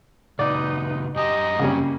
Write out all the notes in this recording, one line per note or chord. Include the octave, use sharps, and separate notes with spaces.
A#2 C#3 D#4 B4 D5
F#2 G4 D#5 G#5 A#5
C#3 G3 A#3 C#4